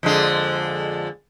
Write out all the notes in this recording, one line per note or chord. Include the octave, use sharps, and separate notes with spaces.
F2 D3 G#3